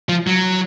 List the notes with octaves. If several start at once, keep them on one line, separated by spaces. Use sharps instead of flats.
F3
F#3